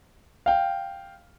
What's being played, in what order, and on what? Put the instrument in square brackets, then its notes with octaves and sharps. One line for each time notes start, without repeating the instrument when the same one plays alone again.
[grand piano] F5 G5